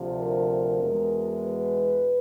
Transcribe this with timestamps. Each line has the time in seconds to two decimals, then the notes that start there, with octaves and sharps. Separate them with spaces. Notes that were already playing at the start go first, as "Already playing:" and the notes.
Already playing: D2 C3 F3
0.17 A#4
0.80 E2 B2 G#3
1.44 B4